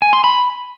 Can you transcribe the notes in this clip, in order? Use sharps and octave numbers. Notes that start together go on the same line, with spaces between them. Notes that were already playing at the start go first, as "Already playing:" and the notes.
G#5
C6
B5